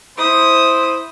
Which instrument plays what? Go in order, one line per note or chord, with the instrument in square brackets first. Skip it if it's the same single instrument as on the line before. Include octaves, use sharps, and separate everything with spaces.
[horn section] E4 C5 [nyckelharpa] D#6